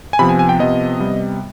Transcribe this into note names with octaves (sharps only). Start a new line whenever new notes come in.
G#5
C3 F3 B3 B5
G#5
G#5
G5
C3 F3 B3 D#5
C3 G3 B3